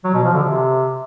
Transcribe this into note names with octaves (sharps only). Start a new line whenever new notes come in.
F#3
B2
F3
D3
C3